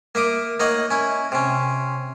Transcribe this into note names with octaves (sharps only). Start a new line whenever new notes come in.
A#3 E5 D6 D#6
A#3 D#4 C#5 D#5 F#5
C#4 E4
C3 C#4